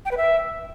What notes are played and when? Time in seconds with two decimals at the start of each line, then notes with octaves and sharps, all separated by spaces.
0.05 G5
0.11 B4
0.17 E5